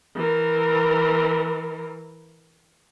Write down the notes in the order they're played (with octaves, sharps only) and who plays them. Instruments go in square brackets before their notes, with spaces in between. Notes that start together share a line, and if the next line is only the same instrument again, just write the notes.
[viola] E3 A#4